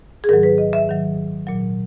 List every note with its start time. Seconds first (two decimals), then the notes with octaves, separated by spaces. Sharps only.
0.24 G#4
0.29 G#2 D#3 F#3 A#4
0.43 B4
0.58 D#5
0.73 E5
0.88 G#2 D#3 F#3
1.47 A#2 F#3